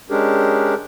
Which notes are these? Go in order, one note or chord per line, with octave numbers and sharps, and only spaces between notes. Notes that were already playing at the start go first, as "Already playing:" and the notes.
G#3 C#4 D4 G4 G#4 A#4